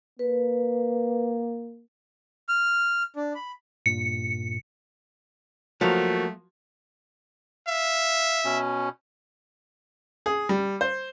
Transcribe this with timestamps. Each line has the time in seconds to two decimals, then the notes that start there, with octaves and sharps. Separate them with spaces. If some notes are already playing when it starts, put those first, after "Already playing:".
0.19 A#3 B4
2.49 F6
3.16 D4
3.35 B5
3.86 G2 A#2 C#7
5.81 F3 F#3 A3 A#3 F#4
7.68 E5 F5
8.45 B2 C#4
10.26 G#4
10.49 G3
10.81 C5